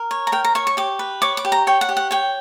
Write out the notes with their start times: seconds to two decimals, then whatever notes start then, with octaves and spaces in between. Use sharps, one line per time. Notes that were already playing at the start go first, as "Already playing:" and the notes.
Already playing: A#4
0.11 C#5
0.27 A#5
0.32 A#4 G5
0.44 A#5
0.55 C#5 C#6
0.67 C#6
0.77 G4 D6
0.99 B4
1.22 C#5 D6
1.37 D6
1.45 G4
1.52 A#5
1.67 C#5 G5
1.81 F#5
1.89 G4
1.97 F#5
2.11 C#5 G5